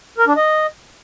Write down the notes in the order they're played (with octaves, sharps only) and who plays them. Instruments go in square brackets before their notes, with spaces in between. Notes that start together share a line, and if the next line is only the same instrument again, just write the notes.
[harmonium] A#4
D4
D#5